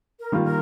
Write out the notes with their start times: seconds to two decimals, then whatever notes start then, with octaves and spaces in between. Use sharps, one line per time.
0.19 A#4
0.32 D#3 G3 A#3 F4
0.45 A#4